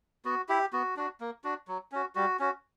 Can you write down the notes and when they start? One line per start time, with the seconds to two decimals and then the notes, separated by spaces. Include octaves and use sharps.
0.25 B3 F#4
0.49 E4 G4
0.73 B3 F#4
0.97 D4 F#4
1.21 A#3
1.44 D4 F#4
1.68 F#3
1.92 C#4 F#4
2.15 G3 F#4
2.39 C#4 F#4